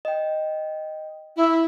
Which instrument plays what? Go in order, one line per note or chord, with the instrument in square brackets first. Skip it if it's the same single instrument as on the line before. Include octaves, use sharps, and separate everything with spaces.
[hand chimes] D#5 G5
[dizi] E4